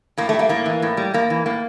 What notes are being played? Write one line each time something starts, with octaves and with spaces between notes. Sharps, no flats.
A2 A#3
G3 A3
A#3
A2 A#3
E3
A2
G3
A2 A#3
E3
A2 A#3